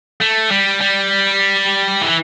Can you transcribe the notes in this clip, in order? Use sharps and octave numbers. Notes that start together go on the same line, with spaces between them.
A3
G3
G3
E3